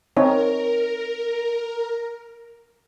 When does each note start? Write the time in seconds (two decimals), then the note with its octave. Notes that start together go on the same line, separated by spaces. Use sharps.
0.17 C4 D#4 A#4 C#5